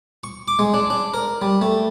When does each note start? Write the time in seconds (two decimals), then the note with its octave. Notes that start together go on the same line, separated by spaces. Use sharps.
0.24 C#6
0.48 D6
0.59 G#3
0.74 D4
0.90 D4
1.14 A#4
1.42 G3
1.61 A3